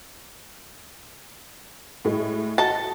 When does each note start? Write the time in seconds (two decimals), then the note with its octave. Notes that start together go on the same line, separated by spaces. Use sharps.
2.05 A2 G#3 A3
2.58 F#4 A4 D#5 A5